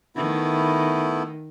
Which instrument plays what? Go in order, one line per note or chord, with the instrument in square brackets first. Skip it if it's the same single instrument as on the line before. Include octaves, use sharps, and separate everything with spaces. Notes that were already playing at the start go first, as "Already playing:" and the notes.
[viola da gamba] D#3 [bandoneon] A3 B3 E4